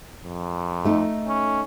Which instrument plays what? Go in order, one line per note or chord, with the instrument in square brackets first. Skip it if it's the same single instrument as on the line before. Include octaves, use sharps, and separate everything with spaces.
[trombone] F2
[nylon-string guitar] A3 D#4
[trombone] C#4